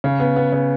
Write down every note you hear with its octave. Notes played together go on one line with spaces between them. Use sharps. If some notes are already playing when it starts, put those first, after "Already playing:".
C#3
B3
B3
C#3